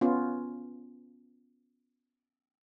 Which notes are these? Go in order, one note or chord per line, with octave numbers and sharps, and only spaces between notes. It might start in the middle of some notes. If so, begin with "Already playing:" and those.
B3 C#4 F4